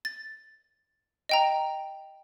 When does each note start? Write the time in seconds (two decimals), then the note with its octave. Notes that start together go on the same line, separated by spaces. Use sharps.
0.05 A6
1.29 D#5 G5 A#5